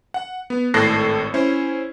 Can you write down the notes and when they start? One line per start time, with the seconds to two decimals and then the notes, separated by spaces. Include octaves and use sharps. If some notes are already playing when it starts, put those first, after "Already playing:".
0.14 F#5
0.50 B3
0.74 G#1 A2 A4 F#6 A#6 C7
1.34 C#4 E4 C5